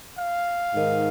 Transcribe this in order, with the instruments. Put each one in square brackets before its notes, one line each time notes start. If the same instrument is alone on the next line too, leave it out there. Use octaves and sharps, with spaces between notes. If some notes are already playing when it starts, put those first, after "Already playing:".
[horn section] F5
G#2 D#3